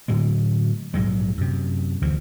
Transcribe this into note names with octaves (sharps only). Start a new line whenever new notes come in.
A2 D3 F#3 G#3
A#1 G#2 F#3 G#3
F#2 C3
D2 E3 F3